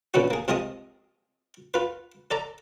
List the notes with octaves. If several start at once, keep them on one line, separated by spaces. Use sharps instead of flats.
A#2 D3 B3 C#4 F#4
A#3 G#4
C3 G#3 F4 G#4 D#5 D#6
F4 B4
A4 D5 A#5